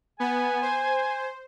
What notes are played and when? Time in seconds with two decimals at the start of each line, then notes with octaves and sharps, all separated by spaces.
0.20 B3 G#5
0.62 C5